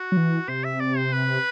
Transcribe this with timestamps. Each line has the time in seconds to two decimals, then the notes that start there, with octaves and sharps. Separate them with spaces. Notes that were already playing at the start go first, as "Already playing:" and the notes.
Already playing: F#4
0.12 F#3
0.17 E3
0.48 C3 C5
0.64 E5
0.80 D5
0.97 C5
1.12 B4